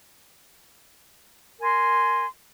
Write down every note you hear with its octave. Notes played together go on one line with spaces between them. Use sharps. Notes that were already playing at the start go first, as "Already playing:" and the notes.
A#4 G#5 C6